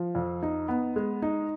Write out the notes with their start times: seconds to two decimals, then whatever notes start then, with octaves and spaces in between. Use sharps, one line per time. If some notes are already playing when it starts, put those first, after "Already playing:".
Already playing: F3
0.15 F2
0.43 D#4
0.68 B3
0.96 G#3
1.22 D#4